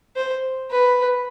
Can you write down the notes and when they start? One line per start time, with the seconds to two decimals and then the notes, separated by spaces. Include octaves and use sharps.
0.16 C5
0.71 B4